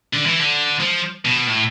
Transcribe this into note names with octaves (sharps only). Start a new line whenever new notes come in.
D3
E3
D3
F3
B2
A2